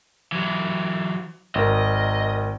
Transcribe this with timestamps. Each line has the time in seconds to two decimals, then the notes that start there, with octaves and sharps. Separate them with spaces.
0.32 E3 F#3
1.55 G#1 A#4 D#5